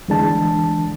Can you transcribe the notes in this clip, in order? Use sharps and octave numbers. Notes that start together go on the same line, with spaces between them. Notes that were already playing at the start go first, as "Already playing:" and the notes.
D2 D3 E3 G#3 D4 A5